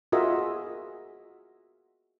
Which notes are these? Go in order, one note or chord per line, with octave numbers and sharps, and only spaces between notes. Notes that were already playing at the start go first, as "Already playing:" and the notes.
F4 F#4 G#4 A#4 D#5 E5